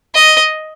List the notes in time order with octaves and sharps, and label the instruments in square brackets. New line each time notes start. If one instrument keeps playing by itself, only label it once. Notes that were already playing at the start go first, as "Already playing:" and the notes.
[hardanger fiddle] D#5